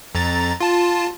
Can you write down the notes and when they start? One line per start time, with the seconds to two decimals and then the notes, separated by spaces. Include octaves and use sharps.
0.15 F2 A#5 A6
0.60 F4 A5